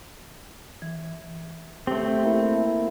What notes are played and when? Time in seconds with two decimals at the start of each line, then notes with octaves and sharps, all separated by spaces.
0.82 E3
1.87 A3 C4 G4
2.25 A#3 E4